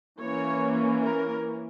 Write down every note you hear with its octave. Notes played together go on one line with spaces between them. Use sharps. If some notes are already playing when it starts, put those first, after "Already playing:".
E3 A#3 C#4 C#5
A#4